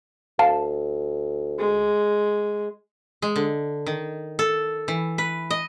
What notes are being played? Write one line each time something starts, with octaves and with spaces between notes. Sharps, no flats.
D2 F5 A5
G#3
G#3
D3
D#3
A4
E3
B4
D#5